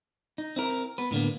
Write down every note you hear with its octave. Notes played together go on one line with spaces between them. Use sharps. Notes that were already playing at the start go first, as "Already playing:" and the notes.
D#4
C4 E4 A#4
B3 B4
A2 D3 A#3 B3